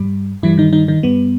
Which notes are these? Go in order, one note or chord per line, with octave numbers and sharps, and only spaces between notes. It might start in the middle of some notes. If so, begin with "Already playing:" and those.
Already playing: G2 G3
G2 E3 G3 E4
D#3 D#4
D#3 D#4
D#3 D#4
G2 G3 B3